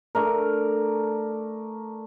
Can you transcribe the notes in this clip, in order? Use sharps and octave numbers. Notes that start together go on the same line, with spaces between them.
A3 D4 A#4